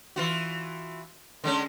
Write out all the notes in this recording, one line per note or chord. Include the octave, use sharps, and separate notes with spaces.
E3 F4 F#4
D3 G#3 C#4